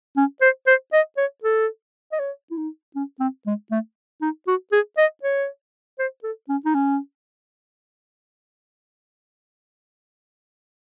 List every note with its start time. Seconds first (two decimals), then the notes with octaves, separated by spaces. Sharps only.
0.17 C#4
0.42 C5
0.67 C5
0.93 D#5
1.17 C#5
1.44 A4
2.12 D#5
2.20 C#5
2.51 E4
2.57 D#4
2.96 C#4
3.20 C4
3.46 G#3
3.71 A3
4.22 D#4
4.47 F#4
4.72 G#4
4.98 D#5
5.23 C#5
5.99 C5
6.24 A4
6.49 C#4
6.66 D#4
6.75 C#4